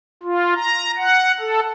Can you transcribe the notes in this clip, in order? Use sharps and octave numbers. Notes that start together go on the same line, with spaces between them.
F4
A#5
F#5
A4